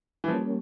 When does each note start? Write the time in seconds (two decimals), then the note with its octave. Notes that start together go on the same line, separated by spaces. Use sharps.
0.24 E3
0.28 F3 G3 A#3 C#4